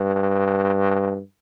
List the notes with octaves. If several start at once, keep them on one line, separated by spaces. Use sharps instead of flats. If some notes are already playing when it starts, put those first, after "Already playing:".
Already playing: G2